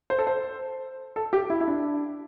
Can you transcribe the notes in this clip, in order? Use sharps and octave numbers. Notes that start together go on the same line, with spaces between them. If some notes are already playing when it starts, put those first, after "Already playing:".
C5
A4
C5
A4
G4
E4
E4
D4